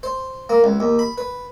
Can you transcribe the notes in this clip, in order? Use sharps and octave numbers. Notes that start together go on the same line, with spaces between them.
C5
A#3
C#2
D#2
B5
B4